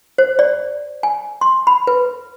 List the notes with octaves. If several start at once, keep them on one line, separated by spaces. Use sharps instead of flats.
C5
D5
G#5
C6
B5
B4